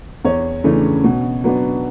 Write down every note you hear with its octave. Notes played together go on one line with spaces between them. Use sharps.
E2 C#5
C#3 E3 A3 D4
B2
F#3 B3 D4